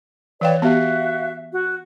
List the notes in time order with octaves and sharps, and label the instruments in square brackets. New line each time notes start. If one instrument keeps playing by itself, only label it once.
[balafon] E3 F5 G5 [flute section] B4 C#5 D5
[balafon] B3 G4 [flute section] F#4 E5 F5
[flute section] F#4